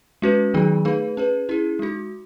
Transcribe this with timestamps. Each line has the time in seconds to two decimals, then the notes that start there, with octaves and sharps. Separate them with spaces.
0.22 G#3 C#4 F#4 B4
0.54 D#3 F#3 B3 D#4 G#4
0.85 A3 D#4 G#4 B4
1.17 C#4 G#4 B4
1.49 C#4 E4 G#4
1.79 G#3 D#4 F#4